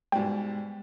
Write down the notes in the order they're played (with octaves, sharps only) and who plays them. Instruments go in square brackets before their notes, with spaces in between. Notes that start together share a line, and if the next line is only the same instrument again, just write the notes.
[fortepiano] G#2 B2 G3 [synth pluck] G5